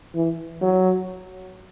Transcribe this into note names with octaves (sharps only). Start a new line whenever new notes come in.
E3
F#3